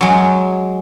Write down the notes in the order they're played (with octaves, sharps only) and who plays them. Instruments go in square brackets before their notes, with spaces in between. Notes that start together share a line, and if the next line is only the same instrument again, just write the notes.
[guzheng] F#3 G#3